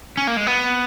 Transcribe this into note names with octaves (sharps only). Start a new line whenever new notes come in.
C#4
A#3
G#3
B3